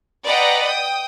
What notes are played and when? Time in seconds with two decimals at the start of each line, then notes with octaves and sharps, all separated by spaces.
0.23 B4 D5 D#5 F#5 G5 A#5
0.64 G5 D#6